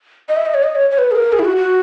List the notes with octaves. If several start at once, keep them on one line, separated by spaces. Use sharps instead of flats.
D#5
E5
D#5
C#5
D#5
C#5
C#5
B4
G#4
A#4
G#4
E4
F#4
F#4